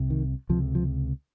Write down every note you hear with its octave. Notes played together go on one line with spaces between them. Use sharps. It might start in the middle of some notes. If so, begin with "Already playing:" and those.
Already playing: C2 C3
D#3
C#2 C3 F3
F3